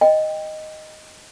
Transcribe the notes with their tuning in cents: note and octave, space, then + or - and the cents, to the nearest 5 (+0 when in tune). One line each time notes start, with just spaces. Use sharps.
D#5 +0 G5 +15